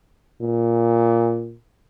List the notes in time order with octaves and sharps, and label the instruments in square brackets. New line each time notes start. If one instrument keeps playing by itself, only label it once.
[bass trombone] A#2